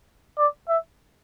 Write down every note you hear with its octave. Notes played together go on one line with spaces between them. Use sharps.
D5
E5